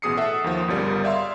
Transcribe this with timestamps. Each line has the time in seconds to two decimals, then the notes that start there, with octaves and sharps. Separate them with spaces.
0.02 A1 B2 G#4 D#6 C7 C#7
0.17 A4 E5 F#5
0.44 D#2 D#3 F3
0.68 G1 C#2 G3 A#4
1.04 D5 E5 F5 C6